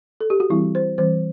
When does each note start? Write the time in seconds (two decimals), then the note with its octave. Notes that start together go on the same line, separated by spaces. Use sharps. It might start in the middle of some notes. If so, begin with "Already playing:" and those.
0.21 A4
0.30 G4
0.40 F#4
0.50 E3 G3 C4 E4
0.75 C5
0.98 E3 G3 C4 C5